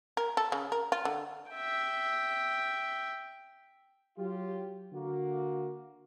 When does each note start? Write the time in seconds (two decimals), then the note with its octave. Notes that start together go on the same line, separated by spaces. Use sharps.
0.17 A#4
0.37 A4
0.52 C#3
0.72 A#4
0.92 F4
1.05 D3
1.51 E5 G5
4.18 F#3 F4 G4
4.93 D3 A#3 F#4